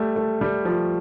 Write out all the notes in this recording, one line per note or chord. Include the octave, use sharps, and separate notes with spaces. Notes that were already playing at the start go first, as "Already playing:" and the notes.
Already playing: G3 A3
A3
G3
F3